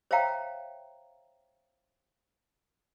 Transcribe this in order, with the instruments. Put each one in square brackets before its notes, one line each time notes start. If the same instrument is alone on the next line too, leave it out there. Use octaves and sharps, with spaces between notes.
[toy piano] C5 C#5 E5 F5 G5 A#5